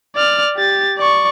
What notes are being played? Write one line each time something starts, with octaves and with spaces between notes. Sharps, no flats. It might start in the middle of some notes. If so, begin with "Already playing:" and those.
D5 F6
G4 A6
D5 C#6